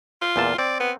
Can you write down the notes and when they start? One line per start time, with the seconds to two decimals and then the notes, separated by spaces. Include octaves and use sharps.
0.22 F4
0.36 E2 A#2 A5
0.58 C4 D5
0.80 B3